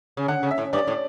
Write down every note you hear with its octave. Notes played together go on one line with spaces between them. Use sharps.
C#3
D3 F#5
C#3
E5
A2
G2 D5
A2